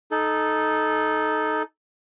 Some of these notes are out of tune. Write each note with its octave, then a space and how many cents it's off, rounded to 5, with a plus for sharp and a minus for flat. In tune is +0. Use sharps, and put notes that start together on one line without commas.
D#4 +0 A4 -15